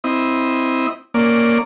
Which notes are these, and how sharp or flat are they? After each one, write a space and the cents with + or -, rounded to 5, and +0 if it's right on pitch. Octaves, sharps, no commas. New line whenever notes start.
C4 +0 E4 -10 D#5 +0
A#3 +0 C#4 -5 D5 +0